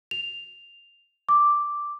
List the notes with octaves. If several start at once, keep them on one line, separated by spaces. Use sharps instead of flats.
F7
D6